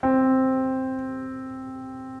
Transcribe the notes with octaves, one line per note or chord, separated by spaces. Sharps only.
C4